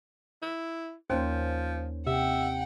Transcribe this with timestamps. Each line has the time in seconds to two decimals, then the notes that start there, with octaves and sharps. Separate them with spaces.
0.42 E4
1.10 D#2 F3 A#3 C#4 C5
2.07 C3 E5 F#5 G5